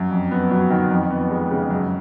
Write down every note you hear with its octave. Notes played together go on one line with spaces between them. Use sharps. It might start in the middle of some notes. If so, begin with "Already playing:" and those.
Already playing: F#2
F2
B3
F#3
D#3
F2
B3
G#3
C#3
F#2